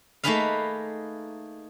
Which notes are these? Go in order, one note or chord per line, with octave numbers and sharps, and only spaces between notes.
A3 A#3 D#4 G#4 B4 F5